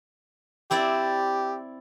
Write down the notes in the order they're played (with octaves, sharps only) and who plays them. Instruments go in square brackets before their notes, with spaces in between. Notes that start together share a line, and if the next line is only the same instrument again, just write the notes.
[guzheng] C4 E4 D5 [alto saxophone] G4